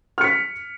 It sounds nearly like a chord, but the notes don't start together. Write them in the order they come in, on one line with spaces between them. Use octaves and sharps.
F6 C#7 B6